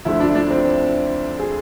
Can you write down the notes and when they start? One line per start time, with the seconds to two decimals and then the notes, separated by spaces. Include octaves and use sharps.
0.05 D2 D3 F3 E4
0.20 D4
0.35 D4
0.50 C4
1.39 G#4